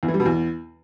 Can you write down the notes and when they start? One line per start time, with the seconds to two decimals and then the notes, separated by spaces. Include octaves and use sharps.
0.03 E2
0.08 E3
0.14 G3
0.20 B2
0.25 E2